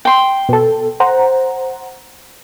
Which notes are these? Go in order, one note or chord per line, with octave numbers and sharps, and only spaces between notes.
G5 C6
B2 A4
C5 F#5 A#5